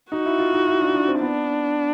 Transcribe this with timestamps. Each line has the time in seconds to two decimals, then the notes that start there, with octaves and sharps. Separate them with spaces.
0.12 D#4 F#4
0.26 E4
0.39 F4
0.53 D#4
0.67 E4
0.81 D4
0.95 D4
1.08 C4
1.21 B3 D4